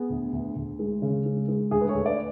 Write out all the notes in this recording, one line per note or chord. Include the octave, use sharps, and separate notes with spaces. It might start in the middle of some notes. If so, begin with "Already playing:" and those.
Already playing: B3 G#4
D2
D2
D2
G#3
C#3
G#3
G#3
D2 G#4
B4
A4 C#5
D2
B4 D5